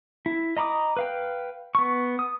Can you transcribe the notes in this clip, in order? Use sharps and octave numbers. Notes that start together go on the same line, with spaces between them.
E4
D#5 A#5 B5 D6 D#6
B4 F5 G5
B3 C#6
D#6